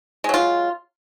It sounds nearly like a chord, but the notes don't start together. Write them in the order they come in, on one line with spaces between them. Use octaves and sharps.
G#3 F#3 F4